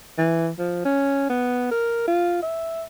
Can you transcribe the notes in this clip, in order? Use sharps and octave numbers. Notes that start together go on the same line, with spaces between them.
E3
F3
C#4
B3
A#4
F4
E5